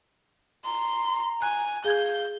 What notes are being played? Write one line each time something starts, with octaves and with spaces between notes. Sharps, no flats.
A#5 C6
G#5 F#6
G#4 F5 G6 G#6